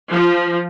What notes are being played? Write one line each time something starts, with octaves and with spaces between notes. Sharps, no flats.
F3